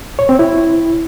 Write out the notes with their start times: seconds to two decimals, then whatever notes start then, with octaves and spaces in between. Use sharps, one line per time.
0.19 C#5
0.29 C4
0.39 E4